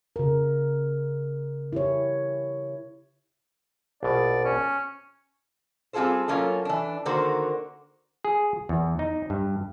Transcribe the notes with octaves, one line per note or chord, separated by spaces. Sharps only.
C#3 A#4
E4 G4 C#5
A#1 B2 D5
C#4
G3 C4 F4 G#4 A4 C5
F#3 A#3 C#4 F4 A4
E3 D4
D3 D#3 A#3 F#4 C5
G#4
E2
D#4
G2